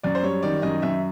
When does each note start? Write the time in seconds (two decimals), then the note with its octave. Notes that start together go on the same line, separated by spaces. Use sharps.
0.03 F#2 D5
0.15 C5
0.23 G3 C#5
0.43 D#3 D5
0.62 F#2 D#5
0.82 F#2 E5